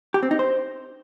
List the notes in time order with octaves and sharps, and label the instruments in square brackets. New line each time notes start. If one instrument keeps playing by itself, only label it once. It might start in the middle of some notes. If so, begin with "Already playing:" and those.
[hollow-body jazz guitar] G4
C4
D#4
C5